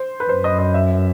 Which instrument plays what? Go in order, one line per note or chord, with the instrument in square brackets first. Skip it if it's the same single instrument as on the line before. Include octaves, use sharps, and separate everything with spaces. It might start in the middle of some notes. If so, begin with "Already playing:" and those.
Already playing: [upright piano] C5
B4
[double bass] F#2 [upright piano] C5
[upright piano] D#5
D#5
E5